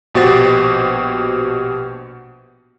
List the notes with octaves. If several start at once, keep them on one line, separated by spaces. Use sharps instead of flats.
A#1 B2 F#4 G4 C5 A6